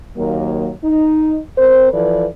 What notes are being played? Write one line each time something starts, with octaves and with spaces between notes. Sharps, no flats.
D#2 F#3 A#3
D#4
C4 A#4 C5
E3 F3 A4 B4 D5